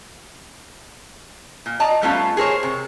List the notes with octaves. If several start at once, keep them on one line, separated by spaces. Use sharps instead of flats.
A#2
D5 D#5 A5 A#5
G3 A3 B3 C#4 F4 A4
G#4 A#4 C5 C#5
C3